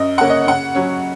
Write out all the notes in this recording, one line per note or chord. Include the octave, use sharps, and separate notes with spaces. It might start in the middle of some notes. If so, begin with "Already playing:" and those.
Already playing: F#2 D#5
C#3 A#3 C#4 F#5
D#5
C#3 F#5
F#3 C#4